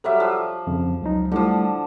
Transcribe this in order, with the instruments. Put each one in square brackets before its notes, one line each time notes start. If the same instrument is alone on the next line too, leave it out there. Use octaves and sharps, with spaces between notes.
[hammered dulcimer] F#3 G3 E5 [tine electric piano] A4
[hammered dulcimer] F3
[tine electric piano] F2 C#3
C#2 F#3 D#4
[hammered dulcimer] D3 F3 [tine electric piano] G3 A3 E4